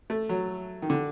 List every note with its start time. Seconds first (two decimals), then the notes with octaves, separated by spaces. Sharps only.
0.10 A3
0.29 F#3
0.82 D#3
0.90 D3